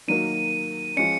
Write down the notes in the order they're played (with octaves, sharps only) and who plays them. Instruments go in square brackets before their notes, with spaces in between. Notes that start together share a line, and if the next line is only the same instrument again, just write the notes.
[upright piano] D#3 F#3 A#3 [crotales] D#7
[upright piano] F3 G#3 C#4 [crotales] C#7